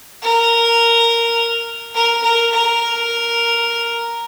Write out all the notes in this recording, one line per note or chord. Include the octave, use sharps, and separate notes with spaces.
A#4
A#4
A#4
A#4